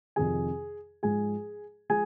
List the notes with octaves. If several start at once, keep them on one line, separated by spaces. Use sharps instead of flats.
F2 C3 D#3 G#4 G#5
G#2 F3 G#3 G#4 G#5
F3 G#3 G#4 G#5